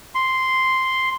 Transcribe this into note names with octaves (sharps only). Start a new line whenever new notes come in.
C6